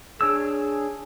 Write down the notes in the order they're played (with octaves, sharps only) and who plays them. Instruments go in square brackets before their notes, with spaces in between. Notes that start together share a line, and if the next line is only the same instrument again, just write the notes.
[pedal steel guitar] D4 C#5 E6 [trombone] G#4